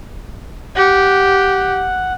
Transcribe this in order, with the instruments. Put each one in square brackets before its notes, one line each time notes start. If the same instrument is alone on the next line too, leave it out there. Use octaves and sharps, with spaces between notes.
[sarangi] G4 [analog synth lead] F#5